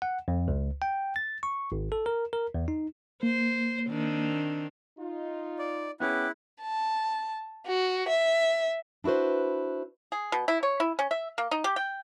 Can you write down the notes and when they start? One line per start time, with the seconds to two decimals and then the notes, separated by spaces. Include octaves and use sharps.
0.02 F#5
0.28 F2
0.48 C#2
0.82 G5
1.16 A6
1.43 C#6
1.72 G#1
1.92 A4
2.06 A#4
2.33 A#4
2.54 E2
2.68 D#4
3.23 A#3 C5
3.89 D#3 C4 D4
4.99 D#4 F4
5.59 D5
6.00 B3 C#4 E4 G#4 G5 D6 F#6
6.62 A5
7.67 F#4
8.09 E5
9.04 D4 E4 F#4 B4 C5
10.12 G#4
10.32 B2
10.48 E4
10.63 C#5
10.80 E4
10.99 C#4
11.11 E5
11.38 A#3
11.51 D#4
11.64 G4
11.76 G5